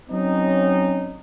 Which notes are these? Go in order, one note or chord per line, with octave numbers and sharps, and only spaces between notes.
F#3 C4 C#4 D#4